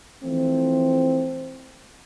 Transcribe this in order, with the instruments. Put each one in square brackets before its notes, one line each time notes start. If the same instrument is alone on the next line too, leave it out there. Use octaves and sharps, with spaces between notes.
[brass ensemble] E3 F3 A3 C4